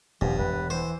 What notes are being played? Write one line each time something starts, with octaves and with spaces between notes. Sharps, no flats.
D#1 G2 F3
E1 B4
E3 C5